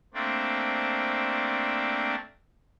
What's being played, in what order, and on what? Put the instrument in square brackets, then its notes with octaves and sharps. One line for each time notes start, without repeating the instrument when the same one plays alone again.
[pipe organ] A3 A#3 C4 D4